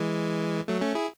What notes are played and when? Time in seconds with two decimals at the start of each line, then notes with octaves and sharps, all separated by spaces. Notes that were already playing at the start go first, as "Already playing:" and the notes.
Already playing: E3 G#3
0.68 F#3 A3
0.81 A3 C#4
0.95 E4 G#4